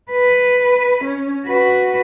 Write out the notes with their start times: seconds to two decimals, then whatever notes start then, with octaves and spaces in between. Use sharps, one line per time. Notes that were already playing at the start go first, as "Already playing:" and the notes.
0.11 B4
1.04 C#4
1.46 F#4 B4